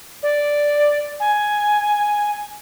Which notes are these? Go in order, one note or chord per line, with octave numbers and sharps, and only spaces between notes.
D5
G#5